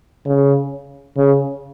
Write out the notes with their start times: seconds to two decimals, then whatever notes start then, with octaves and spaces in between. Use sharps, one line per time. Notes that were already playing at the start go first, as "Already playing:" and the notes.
0.25 C#3
1.17 C#3